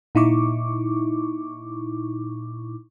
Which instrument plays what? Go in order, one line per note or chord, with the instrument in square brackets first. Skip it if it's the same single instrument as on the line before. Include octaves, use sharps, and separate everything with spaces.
[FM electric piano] A#2 D#4 E4 C#6 D6